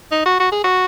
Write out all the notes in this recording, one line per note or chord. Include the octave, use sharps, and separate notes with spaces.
D#4
F#4
F#4
G#4
F#4